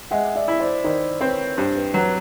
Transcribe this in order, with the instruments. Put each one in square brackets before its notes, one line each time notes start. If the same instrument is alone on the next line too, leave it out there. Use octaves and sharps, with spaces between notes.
[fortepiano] G#3 [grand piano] E5 F#5
[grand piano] D5 E5
[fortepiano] E4
[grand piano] C5 D5
[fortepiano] D#3 [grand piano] C5 D5
[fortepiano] C4 [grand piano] B4 C#5
[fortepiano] G2 [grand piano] C5
[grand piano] B4
[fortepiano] F#3 [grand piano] B4